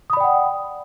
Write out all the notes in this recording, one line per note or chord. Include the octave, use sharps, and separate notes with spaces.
D5 F#5 G5 B5 D#6